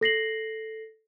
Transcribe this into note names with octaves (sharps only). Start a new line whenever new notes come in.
A4 A#6 C7 F#7